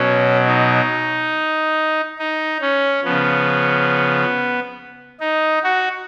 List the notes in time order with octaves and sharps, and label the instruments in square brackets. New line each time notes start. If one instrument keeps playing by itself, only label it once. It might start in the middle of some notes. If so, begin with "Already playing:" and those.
Already playing: [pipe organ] B2 F#3 C#4
D#4
D#4
C#4
C#3 F3 B3
D#4
F#4